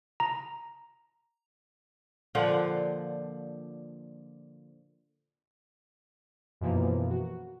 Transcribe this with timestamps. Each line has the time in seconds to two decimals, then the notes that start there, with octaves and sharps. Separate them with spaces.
0.20 A#5
2.35 A#2 D3 F3 F#5
6.61 F#2 B2 E3 F3 A#3
7.10 F#4